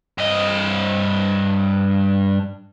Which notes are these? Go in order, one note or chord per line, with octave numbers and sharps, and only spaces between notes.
G2 D#5